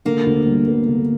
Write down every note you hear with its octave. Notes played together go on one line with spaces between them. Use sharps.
D3 A#3
D2
G3
B3
D3